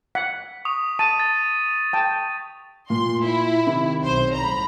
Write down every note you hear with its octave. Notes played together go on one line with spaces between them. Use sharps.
F#5 B6
C#6 D#6 F7
A5 D#6 D#7
A6
G5 A5
A#2 C6
E4
C3 D#3
B1 C5
A#5 B5